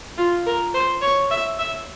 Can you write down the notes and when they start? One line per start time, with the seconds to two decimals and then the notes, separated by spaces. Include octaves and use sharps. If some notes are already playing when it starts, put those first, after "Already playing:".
0.17 F4
0.46 A#4
0.74 C5
1.02 C#5
1.31 E5
1.59 E5